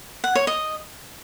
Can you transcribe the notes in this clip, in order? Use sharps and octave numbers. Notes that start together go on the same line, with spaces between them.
F#5
C#5
D#5